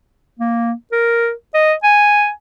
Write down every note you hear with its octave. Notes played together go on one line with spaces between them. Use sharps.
A#3
A#4
D#5
G#5